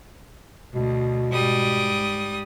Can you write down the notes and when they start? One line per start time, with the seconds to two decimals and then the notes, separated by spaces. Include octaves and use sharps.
0.75 D2 B2
1.32 G#2 G3 D#6